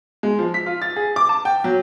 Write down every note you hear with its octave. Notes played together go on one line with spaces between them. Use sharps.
G#3
F3
B6
F4
A6
G#4
D6
A5
G5
F#3